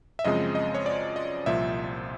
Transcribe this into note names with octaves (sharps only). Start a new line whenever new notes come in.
E5
F#2 C#3 F3 G#3 C4 D#5
D#5
C#5
D5
D#5
C2 A#2 F3 E5